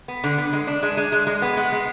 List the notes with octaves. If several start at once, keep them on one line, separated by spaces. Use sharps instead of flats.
B3
D3
B3
G#3
D4
G#3
G#3
G#3
G#3
B3
G#3
G#3